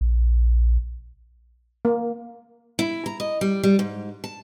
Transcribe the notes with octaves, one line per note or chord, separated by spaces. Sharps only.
A#1
A#3
E4
A#5
D#5
G3
G3
G#2
A5